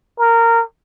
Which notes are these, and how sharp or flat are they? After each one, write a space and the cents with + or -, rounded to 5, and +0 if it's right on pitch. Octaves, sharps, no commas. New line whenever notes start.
A#4 -15